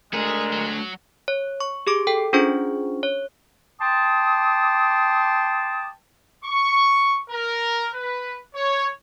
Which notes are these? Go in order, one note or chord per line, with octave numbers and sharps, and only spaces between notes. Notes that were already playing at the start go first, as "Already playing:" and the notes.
G#3 A3 D4 G#4 A#4
F#3
C#5
C#6
G4 G#4 D6 D7
A4 G5
C#4 D4 F4 G#4 C5 C#6
C#5
G5 A5 C6 D6 D#6
C#6
A#4
B4
C#5